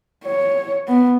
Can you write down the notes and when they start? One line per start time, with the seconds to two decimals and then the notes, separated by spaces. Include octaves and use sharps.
0.25 C#5
0.88 B3